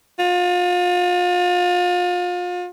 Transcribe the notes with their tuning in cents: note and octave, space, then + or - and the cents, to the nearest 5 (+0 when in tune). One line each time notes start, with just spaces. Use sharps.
F4 +35